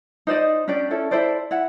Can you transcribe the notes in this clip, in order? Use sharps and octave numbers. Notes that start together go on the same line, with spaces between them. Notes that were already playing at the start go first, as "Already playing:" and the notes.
D#4 C5 D5 D#5
C#4 D4 G4 D5
C#4 E4 A4
E4 A4 C5 D5
E4 F#5